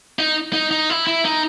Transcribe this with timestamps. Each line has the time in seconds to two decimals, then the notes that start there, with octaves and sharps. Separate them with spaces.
0.19 D#4
0.53 D#4
0.71 D#4
0.90 E4
1.07 E4
1.25 D#4